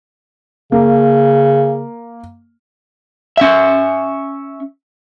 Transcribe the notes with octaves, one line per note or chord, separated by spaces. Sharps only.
C#3 A#3
C#4 E5